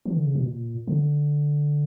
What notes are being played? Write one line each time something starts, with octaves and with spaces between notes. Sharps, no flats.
E3
D3
C#3
B2
A#2
D3